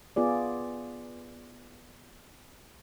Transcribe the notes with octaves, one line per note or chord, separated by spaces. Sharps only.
B3 F4 G#4 D5